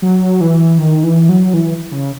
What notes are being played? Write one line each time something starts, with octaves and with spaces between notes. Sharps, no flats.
F#3
E3
D#3
E3
F#3
E3
C#3